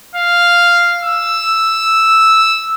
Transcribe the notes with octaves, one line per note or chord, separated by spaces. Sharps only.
F5
E6